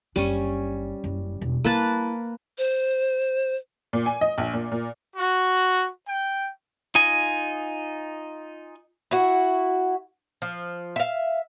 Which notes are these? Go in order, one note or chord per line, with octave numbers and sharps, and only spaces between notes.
F#1 G3 C#4 D4
F#1
E1
A#3 E4 B4 A5
C5
A#2
G#5
D#5
A#1
A#2
A#2
F#4
G5
D#4 F4 D#5 G#5
E4 F#4
F3
E5 F5